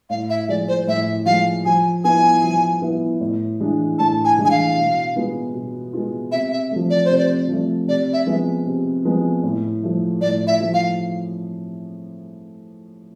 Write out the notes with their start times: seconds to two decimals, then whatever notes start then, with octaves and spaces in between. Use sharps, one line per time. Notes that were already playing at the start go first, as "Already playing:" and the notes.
0.10 A2 F5
0.30 E5
0.48 F3 G#3 D5
0.68 C5
0.87 A2 E5
1.26 F3 G#3 F5
1.66 F3 G#5
2.04 B3 E4 G#5
2.43 F3
2.82 B3 E4
3.21 A2
3.60 E3 G#3 D4
3.99 A2 A5
4.25 G#5
4.38 E3 G#3 D4
4.45 G#5
4.51 F5
4.77 B2
5.16 G#3 B3 F4
5.54 B2
5.93 G#3 B3 F4
6.32 C3 E5
6.52 E5
6.71 F3 A3
6.90 D5
7.05 C5
7.10 C3
7.18 D5
7.48 F3 A3
7.88 C3 D5
8.13 E5
8.26 F3 G#3 B3
8.66 C3
9.05 F3 G#3 B3
9.43 A2
9.83 F3 A3
10.21 A2 D5
10.47 E5
10.60 F3 A3
10.74 F5